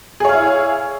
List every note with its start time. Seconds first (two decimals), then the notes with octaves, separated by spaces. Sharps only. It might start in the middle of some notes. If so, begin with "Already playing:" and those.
0.20 G#4
0.25 C#5
0.29 F5
0.33 E4